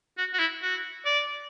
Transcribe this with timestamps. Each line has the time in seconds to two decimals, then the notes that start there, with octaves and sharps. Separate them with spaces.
0.18 F#4
0.34 F#4
0.39 E4
0.62 F#4
1.05 D5